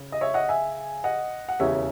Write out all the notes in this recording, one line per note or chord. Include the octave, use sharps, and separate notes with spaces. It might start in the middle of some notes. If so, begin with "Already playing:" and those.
Already playing: C#3
D#5
C#5 E5
D#5 F#5
E5 G#5
D#5 F#5
F#5
E1 D#2 C#3 E3 C#5 E5